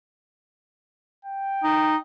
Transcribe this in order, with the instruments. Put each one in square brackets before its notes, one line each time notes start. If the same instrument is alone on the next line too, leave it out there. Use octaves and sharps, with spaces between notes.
[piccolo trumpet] G5
[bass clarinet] D#4